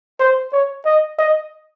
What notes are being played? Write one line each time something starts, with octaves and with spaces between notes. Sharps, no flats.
C5
C#5
D#5
D#5